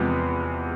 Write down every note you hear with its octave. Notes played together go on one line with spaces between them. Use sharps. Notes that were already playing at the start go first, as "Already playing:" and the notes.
Already playing: E2 C3 F3 G#3 B3